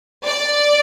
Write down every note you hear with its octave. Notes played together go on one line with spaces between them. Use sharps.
D5